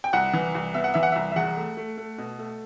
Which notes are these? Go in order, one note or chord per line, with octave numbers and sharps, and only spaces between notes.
G5
C2 F#5
E3
C2
B3 E5
F#5
E3 E5
F#5
C2 E5
E5
E2 F#5
A3
A3
A3
B2
A3